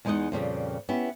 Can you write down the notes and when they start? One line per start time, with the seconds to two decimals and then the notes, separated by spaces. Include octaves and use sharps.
0.05 E2 G#3 D#4 C5 D#5 F#5
0.32 F2 A#2 C#3 G3
0.89 B3 C#4 E4 G4